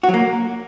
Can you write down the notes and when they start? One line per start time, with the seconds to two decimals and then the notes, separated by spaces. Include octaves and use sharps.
0.03 F#4
0.09 F#3
0.14 A#3